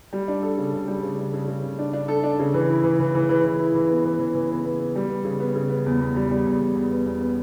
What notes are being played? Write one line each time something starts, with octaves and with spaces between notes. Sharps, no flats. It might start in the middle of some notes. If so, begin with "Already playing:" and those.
G3
D4
A4
C#3
C#3
G3
C#3
C#3
C#3
C#3
C#3
D4
D4
A4
D4
C#3
E3
E4
E3
E3
E3
E3
E3
E4
E3
B3
E3
E3
E3
B3
B3
B3
G3
B3
C#3
B3
C#3
B3
E2
E2
G3
G3
E2
E2
E2
B3
E2
B3